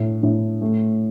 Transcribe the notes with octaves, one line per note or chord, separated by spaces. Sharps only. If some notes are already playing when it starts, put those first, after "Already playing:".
Already playing: A2
A2
A3